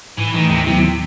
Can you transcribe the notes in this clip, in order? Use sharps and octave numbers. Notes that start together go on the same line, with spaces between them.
A2 E3
D#3 E3 A3
D#2 C3
C3 D#3 F#3 B3 E4